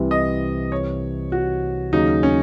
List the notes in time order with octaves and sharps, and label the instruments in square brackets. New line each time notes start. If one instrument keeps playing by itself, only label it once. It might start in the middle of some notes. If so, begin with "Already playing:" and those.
Already playing: [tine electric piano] C2 C3 E3
[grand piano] D#5
C#5
F#4
[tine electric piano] D#2 C#3 F#3 [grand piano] D#4
[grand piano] C#4